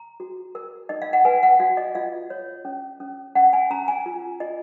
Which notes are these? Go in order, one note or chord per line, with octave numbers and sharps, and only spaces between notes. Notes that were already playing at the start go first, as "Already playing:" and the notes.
Already playing: A#5
F#4
A#4
D#4 D#5
F5
F#5
B4 G#5
F#5
F#4 F5
D#5
F4 F5
C#5
C#4
C#4
C#4 F#5
G#5
C#4 A#5
G#5
F4
F4 D#5